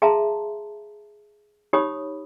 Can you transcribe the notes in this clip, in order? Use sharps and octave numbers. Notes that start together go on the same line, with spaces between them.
G#4 E5 F5 A5 A#5 C6
D#4 G4 C#5 B5 D#6